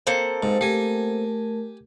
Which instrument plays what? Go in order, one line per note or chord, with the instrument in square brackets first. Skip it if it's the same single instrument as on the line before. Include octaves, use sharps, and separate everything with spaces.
[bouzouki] A#3 C4 A4
[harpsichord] G#2
[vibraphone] A3 A#4 [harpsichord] G4 G#5